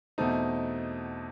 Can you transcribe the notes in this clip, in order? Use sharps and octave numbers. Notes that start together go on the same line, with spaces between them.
E2 B2 A3 C4 D#4